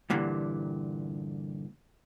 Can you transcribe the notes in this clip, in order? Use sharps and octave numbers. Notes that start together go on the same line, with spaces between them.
G2 A#2 D3 E3